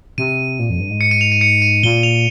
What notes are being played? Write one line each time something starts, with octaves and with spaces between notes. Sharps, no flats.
C3 D#7
A#2
F2
G2
G#2
C#7
D#7
F7
D#7
C#7
D#7
A#2 G7
F7